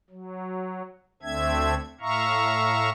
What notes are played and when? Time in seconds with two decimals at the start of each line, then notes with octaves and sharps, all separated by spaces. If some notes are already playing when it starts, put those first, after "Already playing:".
0.10 F#3
1.23 D2 A3 C4 D4 E5 G#6
2.01 A2 E5 F5 A#5 C#6